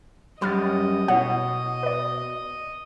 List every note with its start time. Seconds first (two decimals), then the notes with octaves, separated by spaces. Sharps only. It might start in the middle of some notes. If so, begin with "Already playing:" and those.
0.42 F#2 G3 D#5 B5 F6 A6
1.08 B2 E4 C#5 F#5
1.83 B4 D5